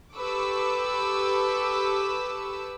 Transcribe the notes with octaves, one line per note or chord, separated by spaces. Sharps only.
G4 A4 B4 C#6 D6 E6